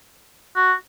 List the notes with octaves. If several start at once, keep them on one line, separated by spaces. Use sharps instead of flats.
F#4